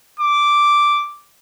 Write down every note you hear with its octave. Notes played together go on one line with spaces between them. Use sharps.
D6